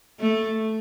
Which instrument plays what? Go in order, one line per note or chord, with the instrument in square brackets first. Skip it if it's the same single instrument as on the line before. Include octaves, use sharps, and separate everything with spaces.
[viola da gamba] A3